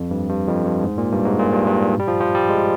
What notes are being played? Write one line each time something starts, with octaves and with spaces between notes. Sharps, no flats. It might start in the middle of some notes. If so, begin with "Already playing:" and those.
Already playing: F2
G2
G2
F2
G2
G#2
A#2
G2
G#2
A#2
G2
G2
G3
F3
F3
G3
G#3